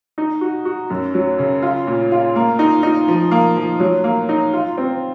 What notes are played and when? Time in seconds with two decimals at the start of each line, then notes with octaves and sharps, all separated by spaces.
0.18 D#4
0.41 F#4
0.65 F#4
0.90 F#2
1.14 F#3
1.38 C#3
1.62 F4
1.87 A#2
2.11 F4
2.36 A#3
2.59 D#4
2.83 D#4
3.08 F3
3.31 A#3
3.57 F3
3.80 F#3
4.04 A#3
4.29 D#4
4.53 F4
4.77 C4